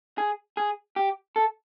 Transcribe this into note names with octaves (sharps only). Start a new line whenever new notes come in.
G#4
G#4
G4
A4